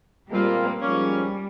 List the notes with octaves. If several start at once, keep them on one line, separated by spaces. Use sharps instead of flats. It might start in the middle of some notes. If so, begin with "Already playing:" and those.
A#2 G3 G#3 A#3 C4 F4
G#2 F3 G3 A#3 C#4